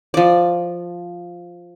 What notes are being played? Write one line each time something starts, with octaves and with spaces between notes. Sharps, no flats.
F3 D5